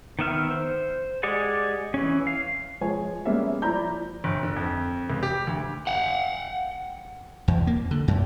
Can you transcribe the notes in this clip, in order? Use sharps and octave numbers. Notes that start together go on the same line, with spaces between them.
D#3 B3 E5 F6
C5
G#3 G4 G#4 D5 F#5
E3 C#4
F5
F3 G#3 C#5 G#5
G3 G#3 A#3 B3 C#4 E5
F3 E4 D5 A#5 B5 G6
G1
D3
F2
C#2
G4
D2
F#5 G5
E2
A#3
D3
F#2